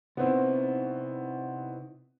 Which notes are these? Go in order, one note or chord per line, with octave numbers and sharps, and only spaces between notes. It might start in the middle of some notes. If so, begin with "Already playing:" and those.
C3 B3 C4 D#4 E4